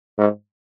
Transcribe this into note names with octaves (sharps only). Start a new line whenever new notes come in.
G#2